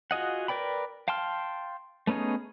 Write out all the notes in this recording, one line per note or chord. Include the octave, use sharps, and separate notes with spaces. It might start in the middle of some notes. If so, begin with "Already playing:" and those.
F4 F#4 G#4 D#5 F#5
A#4 B4 D5 G5 B5
F5 G5 A5 C6 F6
A3 B3 C#4 D#4 G#4